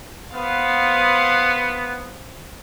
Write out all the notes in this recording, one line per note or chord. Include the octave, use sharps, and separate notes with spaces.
B3 C5 F5